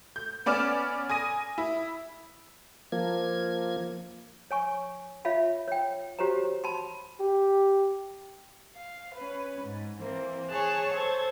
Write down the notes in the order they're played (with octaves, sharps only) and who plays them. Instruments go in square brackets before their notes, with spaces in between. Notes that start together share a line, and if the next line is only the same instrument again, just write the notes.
[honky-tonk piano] G6
B3 C#4 D5 D6 F6 E7
G#5 D#6 A#6 D#7
E4
[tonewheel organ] F3 A#3 G#6
[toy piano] C#5 G#5 C#6
F4 C#5 E5 F5 B5
C#5 G5
F#4 G4 C5 C#5 A#5
A5 B5 C6
[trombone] G4
[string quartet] F5
C#4 B4
G#2
E3 A#3 C4
[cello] G#4 C#5 [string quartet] A5 F#6
[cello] A4 [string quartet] C5 G#6